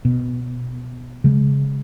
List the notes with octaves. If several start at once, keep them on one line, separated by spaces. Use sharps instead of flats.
B2
C#3 G#3